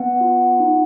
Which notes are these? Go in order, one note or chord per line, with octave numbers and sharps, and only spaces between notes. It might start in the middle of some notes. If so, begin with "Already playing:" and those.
Already playing: B3 F#5
F4
D#4